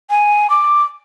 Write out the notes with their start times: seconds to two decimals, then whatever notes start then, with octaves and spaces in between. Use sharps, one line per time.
0.10 G#5
0.50 D6